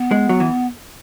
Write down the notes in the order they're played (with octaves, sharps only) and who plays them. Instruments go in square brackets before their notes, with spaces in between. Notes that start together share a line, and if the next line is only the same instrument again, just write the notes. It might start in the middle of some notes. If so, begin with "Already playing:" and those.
Already playing: [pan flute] B3
[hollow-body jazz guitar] G#3
F#3
E3